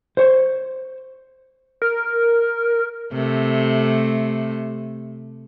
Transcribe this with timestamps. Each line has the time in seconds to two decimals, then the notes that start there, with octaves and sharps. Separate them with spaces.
0.17 C5 C#5
1.82 A#4
3.12 C3 A3